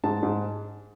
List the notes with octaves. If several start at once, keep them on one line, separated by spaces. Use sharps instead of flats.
G#2 A5
G#2